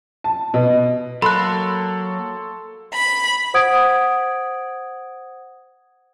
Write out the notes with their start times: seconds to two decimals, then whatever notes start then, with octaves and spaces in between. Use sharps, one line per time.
0.24 A5
0.54 B2
1.22 F#3 A#3 A4 B5 C6 F#6
2.94 B5
3.54 C5 F#5 D#6 G#6 D7